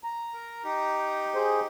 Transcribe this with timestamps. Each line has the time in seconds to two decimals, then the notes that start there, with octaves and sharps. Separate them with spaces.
0.04 A#5
0.34 A#4
0.64 D#4 G4
1.35 G#4 C5